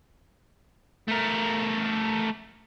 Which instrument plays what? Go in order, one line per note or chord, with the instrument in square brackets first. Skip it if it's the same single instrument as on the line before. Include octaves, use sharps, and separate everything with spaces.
[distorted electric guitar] A3 A#4